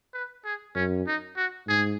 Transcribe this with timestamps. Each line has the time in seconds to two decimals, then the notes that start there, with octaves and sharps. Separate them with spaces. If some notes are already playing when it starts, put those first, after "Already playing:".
0.14 B4
0.45 G#4
0.75 F#2 C#4
1.07 D#4
1.37 F#4
1.67 G#2 G#4